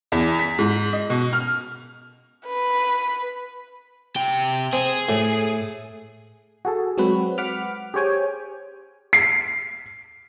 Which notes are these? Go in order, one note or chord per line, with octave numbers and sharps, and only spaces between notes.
E2
B6
G#2
D#5
B2
F6
B4
C3 G5
C4 G#4
A2
F#4 G#4 A4
F#3 G#3 C4 F#4 B4
F#5 B5 D6 F6
G4 G#4 C5 C#5 G5 G#5
C7